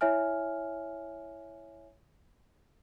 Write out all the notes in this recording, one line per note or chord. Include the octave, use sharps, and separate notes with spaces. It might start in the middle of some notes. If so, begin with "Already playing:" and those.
E4 C#5 E5 G#5 F6